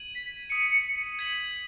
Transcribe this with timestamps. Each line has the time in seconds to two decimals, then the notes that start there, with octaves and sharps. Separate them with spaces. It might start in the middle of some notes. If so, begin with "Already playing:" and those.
Already playing: G#6 D#7 F#7
0.15 B6
0.50 D#6 B6 C#7 D#7
1.19 G#6 B6 F#7